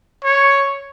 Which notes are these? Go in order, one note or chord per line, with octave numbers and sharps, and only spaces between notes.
C#5